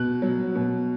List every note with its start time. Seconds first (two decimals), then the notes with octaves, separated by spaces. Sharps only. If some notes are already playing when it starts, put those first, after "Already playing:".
Already playing: B2 F#6
0.22 F#3
0.55 B2